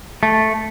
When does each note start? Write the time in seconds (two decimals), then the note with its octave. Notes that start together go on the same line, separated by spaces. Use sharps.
0.23 A3